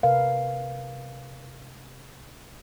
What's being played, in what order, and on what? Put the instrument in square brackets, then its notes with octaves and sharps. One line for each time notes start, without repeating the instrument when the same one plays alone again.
[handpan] C3 A#4 B4 F5